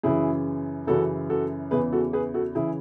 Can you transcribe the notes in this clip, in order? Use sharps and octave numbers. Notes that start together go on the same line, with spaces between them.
F#2 C#3 E3 E4 G#4
F#2 C#3 E3 F#4 A4
F#4 A4
E2 C#3 E3 G#4 B4
F#4 A4
G#4 B4
F#4 A4
C#3 E3 E4 G#4